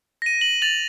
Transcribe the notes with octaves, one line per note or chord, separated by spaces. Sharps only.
A#6 D#7
F#7
A6 F7 F#7